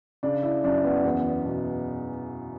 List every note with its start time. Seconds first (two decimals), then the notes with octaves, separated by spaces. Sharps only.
0.23 C#3 D4
0.43 E4
0.64 F#2 D4
0.85 B3
1.05 E2 B3
1.45 B2